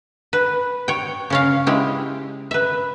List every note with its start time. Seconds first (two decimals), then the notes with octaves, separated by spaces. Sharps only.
0.33 B4
0.88 C#5 G5
1.30 C#3 C#4 F5
1.67 G#3 E4 G4
2.51 B4 E5